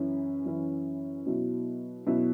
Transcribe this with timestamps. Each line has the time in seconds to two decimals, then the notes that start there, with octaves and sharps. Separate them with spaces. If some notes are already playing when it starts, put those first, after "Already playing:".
Already playing: F#2 E3 C#4 E4
0.45 F#2 E3 C#4 E4
1.26 B2 F#3 E4
2.07 B2 F#3 E4